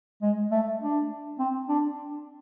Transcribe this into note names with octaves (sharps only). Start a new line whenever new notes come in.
G#3
A3
D4
C4
D4